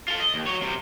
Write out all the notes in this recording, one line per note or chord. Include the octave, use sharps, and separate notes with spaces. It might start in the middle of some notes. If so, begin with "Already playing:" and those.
F4 A4
D#5
D#2
F#3 C#5
C2 C3